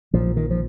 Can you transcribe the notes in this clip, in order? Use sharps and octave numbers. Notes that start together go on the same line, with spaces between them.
A#1 A#2 F3
D#3
F3